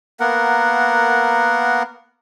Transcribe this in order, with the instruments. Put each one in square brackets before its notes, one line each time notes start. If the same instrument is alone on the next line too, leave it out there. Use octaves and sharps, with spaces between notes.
[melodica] A#3 B3 A#4 F#5